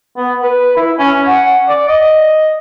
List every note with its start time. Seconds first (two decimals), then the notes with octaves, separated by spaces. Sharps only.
0.17 B3
0.42 B4
0.76 E4
0.99 C#4
1.27 F#5
1.68 D5
1.88 D#5